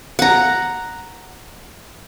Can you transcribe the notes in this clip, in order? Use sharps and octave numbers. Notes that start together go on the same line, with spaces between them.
F#5 A#5